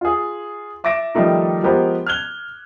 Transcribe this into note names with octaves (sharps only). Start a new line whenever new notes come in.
F4 G#4
E5 D6 A6 A#6 D7 E7
D#3 F3 G3 A3 D#4
F3 G#3 B3 G4 A#4 C5
F6 F#6 G#6 F7 G7